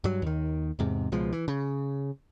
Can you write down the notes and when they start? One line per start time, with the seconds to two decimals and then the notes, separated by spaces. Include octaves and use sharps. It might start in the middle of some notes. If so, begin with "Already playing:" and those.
0.04 G2 F#3
0.22 D#2 D#3
0.79 E2 G#2 C3
1.12 C#2 B2 F3 G#3
1.33 E3
1.48 C#3